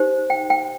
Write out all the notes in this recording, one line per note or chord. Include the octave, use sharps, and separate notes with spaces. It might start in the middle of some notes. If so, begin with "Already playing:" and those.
Already playing: D#4 G4 C5
G5
G5